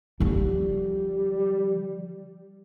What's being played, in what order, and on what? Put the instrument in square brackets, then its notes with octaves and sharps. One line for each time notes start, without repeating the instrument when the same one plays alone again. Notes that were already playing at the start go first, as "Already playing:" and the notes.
[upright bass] D3 F3 [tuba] G3